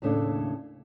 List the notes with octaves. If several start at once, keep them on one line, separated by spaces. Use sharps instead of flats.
D#2 A2 C#3 A3 D4